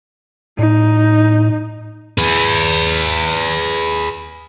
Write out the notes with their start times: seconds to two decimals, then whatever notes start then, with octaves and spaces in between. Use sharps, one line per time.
0.59 A2 D#4
2.18 G#4 B4